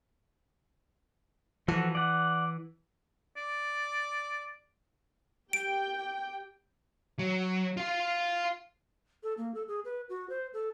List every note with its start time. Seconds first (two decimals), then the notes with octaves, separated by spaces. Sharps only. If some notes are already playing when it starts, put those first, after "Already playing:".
1.68 E3 F3 F#4 A4
1.95 D5 F#5
3.37 D5
5.53 G4 G5 D7
7.19 F#3
7.77 F4 F5
9.23 A4
9.38 A#3
9.55 A4
9.68 G#4
9.85 B4
10.09 F#4
10.30 C5
10.54 A4